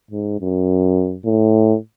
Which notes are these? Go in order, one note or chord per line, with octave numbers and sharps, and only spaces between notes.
G#2
F#2
A2